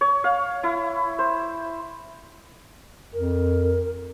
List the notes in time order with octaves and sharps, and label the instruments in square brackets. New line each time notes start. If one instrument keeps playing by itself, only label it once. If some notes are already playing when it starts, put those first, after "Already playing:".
[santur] C#5
F5
E4
C5
[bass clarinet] F2 [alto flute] A#4